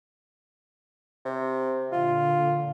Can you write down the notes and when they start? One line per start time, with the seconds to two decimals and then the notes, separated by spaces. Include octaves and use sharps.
1.26 C3
1.92 A#2 D3 F4